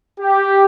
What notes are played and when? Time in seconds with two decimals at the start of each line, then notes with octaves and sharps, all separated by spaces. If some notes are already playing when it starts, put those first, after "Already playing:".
0.20 G4